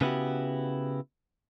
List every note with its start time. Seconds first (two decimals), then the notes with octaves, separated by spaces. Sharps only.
0.01 C#3 B3 E4 F#4 G4